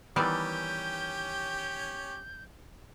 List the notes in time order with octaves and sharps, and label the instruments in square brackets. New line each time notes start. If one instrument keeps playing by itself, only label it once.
[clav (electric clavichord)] D#3 E3 [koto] G3 B3 D5 [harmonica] C#4 G4 [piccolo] G6